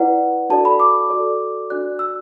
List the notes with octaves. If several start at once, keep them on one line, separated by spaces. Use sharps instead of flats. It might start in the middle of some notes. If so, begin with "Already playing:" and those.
Already playing: E4 B4 D5 F#5
D4 F#4 A4 D5 A5
B5
D6
F#4 A4 D5
D4 F#4 D5 F#6
E6